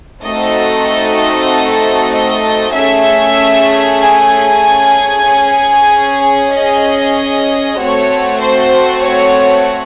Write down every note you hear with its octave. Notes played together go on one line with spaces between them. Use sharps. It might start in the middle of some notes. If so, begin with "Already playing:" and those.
A3 C4 D#4 F#4 A4 D#5
D#5
A3 C#4 G#4 E5
G#5
C#4 G#4
D#5
A3 C4 F#4 C#5
C5
C#5